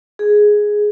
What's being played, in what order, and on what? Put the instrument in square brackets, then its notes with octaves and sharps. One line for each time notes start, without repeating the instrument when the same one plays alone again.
[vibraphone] G#4